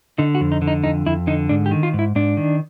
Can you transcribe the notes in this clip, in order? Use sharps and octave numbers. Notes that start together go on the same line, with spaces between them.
D3 D#4
F#4
F2
D#4
D3
D#4
F2 D#4
F2 E4
D3 D#4
G#2 D4
G4
D#3
F4
G#2
E4
G#2 D4
D#3